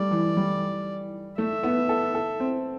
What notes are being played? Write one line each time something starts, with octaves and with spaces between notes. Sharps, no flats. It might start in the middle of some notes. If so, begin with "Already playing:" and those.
Already playing: G3 A3 D5
E3
G3
A3 E5
B3
A4
A4
C4